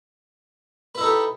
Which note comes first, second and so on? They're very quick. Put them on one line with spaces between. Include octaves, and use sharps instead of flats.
B4 E4 D#4 A4 G4